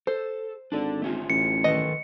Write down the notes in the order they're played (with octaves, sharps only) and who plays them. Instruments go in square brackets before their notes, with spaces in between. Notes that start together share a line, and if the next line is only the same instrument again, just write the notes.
[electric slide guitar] A4 [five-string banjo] C5
[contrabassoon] G#1 [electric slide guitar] D4 A4 D5
[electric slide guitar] A3 C#4 F4
[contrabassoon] A1 [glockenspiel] C#7
[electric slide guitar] D#3 A4 B4 [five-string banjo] D#5